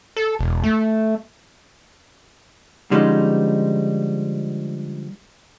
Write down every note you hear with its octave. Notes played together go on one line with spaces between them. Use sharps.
A4
E1
A3
D3 F3 G3 G#3 C#4 D#4